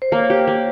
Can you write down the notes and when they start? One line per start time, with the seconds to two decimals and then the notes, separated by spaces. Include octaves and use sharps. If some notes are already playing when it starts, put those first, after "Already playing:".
0.02 C5
0.12 A#3 C#5
0.30 G4
0.48 A#3